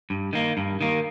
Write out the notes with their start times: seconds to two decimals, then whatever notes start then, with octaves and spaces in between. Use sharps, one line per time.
0.10 G2
0.33 D#3 A#3
0.57 G2
0.81 D#3 A#3